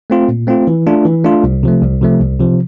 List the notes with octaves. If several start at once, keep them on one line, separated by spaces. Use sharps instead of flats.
A3 C4 F4
A#2
A3 C4 F4
E3
A3 D4 F4
E3
A3 D4 F4
C2
C3 F3 A3
C2
C3 F3 A3
C2
C3 F3